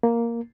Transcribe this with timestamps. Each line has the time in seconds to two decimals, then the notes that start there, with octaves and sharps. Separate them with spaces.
0.03 A#3